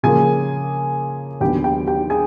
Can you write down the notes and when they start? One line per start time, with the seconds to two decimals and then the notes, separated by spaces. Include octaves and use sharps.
0.03 C#3 F3 A#3 G#4 G#5
1.41 D#2 D3 F#3 B3 G4 G5
1.64 G4 G5
1.87 G4 G5
2.10 G#4 G#5